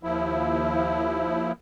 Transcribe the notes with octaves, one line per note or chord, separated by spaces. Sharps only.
D#2 F3 E4